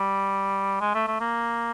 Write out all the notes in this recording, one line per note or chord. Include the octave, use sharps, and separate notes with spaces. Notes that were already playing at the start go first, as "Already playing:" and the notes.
Already playing: G3
G#3
A3
A3
A#3